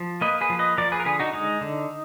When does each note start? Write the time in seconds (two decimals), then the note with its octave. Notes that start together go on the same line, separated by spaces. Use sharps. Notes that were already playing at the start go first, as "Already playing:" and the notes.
Already playing: F3
0.21 A#3 B4 D#5
0.41 G#4 B4
0.50 F3
0.59 B4 D#5
0.77 F3 A#4 D5
0.92 G#4 B4
1.00 A#4
1.05 D3 G#4 B4
1.19 D#4 F#4
1.33 G#3 D#4
1.61 D3